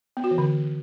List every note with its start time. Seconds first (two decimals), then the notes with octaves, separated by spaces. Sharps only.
0.17 B3
0.24 F#4
0.31 E3
0.38 D3